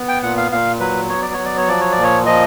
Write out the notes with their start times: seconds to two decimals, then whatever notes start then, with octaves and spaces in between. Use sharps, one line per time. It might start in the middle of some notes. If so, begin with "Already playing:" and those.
Already playing: B3
0.08 G5
0.23 A#2 F#5
0.37 F5
0.52 A#2 F5
0.80 F#3 B4
1.09 B3 C#5
1.22 D5
1.33 C#5
1.38 F#3
1.45 D5
1.57 C#5
1.67 F3 D5
1.81 C#5
1.92 D5
1.97 A#2
2.03 C#5
2.26 F3 D#5